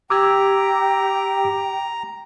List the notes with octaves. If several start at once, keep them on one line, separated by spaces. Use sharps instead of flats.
G4 G5 A#5 D6 E6 G#6